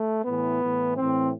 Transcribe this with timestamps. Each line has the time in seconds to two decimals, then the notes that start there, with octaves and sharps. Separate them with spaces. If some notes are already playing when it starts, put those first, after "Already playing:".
Already playing: A3
0.25 A2 E3 B3
0.61 A2 E3
0.97 A2 E3 C4